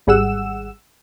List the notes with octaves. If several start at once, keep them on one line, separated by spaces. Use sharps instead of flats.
G#1 G3 G#4 F#5 E6 E7